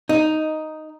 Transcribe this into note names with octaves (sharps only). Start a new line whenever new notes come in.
D#4